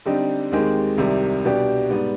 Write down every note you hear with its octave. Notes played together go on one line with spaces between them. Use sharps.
D3 G3 C4 D#4 G4
D#2 D#3 G#3 C4 G4
C2 C3 D#3 G3
B2 G3 D4 G4
G#2 G3 B3